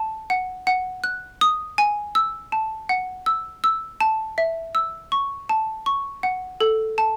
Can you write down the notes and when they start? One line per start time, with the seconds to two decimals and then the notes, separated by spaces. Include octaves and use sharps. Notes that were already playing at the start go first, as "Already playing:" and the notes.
Already playing: A5
0.30 F#5
0.67 F#5
1.04 F#6
1.41 D#6
1.78 G#5
2.15 E6
2.52 A5
2.89 F#5
3.26 E6
3.64 E6
4.00 A5
4.38 E5
4.75 E6
5.12 C#6
5.49 A5
5.86 C#6
6.23 F#5
6.61 A4
6.98 A5